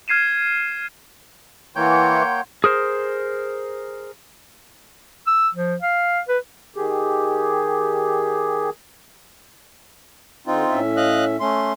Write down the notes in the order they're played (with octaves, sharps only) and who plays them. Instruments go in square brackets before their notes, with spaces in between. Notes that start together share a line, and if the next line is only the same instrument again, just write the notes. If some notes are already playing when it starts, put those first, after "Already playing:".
[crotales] F6 G#6 C7 D#7 E7
[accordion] E3 [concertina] A#3 C#5 G5 [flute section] F#5 C6
[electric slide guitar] G#4 A#4 C5
[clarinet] E6
F3
F5
B4
[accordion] D#3 G4 G#4
[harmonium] D3 [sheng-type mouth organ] C4 D#4 F4
[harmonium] A2 C#4 E5
[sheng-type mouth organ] D#5 F5 F#6
A3 C#4 C6